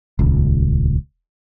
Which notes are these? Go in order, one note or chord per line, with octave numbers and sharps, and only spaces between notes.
D#1 C#2